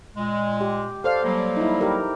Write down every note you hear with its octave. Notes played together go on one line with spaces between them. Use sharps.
A#2 G#3
G4
A4 C5 D5 F5
F#3 G3 A#3
D#4 E4
G4 A#4